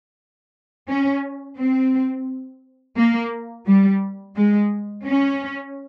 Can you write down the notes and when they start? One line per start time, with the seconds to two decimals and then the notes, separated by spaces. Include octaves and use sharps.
0.88 C#4
1.58 C4
2.97 A#3
3.67 G3
4.36 G#3
5.06 C#4